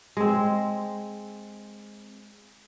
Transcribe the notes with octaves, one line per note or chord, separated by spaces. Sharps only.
G#3 C4